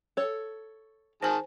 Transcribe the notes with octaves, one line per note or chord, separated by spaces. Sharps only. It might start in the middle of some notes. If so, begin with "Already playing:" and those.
A4 C#5
D#3 G#4 C5 G#5 A5